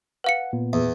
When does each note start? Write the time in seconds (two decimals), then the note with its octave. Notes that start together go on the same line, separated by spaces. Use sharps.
0.24 B4 F5 F#5 C#7
0.53 A#2 B3
0.73 E2